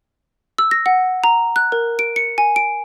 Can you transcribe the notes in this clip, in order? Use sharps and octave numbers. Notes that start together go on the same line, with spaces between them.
E6
A#6
F#5
A#5
F#6
A#4
D7
C#7
G#5
D7